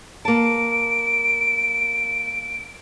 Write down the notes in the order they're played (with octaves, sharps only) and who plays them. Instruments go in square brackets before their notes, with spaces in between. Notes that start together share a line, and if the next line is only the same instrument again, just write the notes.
[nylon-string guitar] A#3 A5 [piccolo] D7